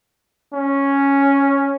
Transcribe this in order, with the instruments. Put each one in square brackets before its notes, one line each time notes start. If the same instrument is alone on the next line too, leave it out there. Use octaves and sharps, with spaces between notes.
[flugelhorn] C#4